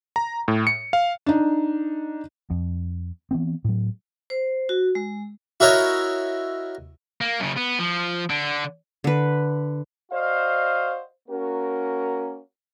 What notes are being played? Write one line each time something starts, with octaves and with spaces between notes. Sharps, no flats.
A#5
A2
C#7
F5
D4 D#4
F2
E3 B3 C4
A2 F#3
C5
F#4
G#3
E4 F#4 A#4 C#5 D#5
A#3
F#2 C#3
B3
F3
D3 D4
D3 B4
F#4 C5 D5 D#5 F5
A#3 C#4 F#4 A#4